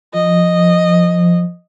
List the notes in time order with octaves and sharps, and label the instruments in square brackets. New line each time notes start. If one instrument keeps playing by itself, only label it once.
[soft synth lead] F3 [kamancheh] D#5